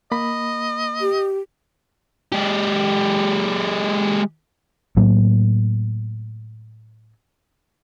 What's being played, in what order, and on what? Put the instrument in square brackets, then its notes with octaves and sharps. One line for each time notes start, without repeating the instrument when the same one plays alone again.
[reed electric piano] A#3 B5 [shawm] D#5
[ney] G4
[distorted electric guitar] G#3 G4
[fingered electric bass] A2 F#3 A#3